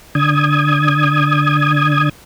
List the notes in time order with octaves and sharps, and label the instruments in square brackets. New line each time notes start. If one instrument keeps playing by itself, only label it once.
[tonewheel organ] D3 D#6 G#6